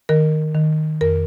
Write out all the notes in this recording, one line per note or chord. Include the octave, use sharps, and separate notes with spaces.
D#3 A#4
D#3
F2 A#4